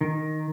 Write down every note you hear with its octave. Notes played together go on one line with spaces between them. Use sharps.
D#3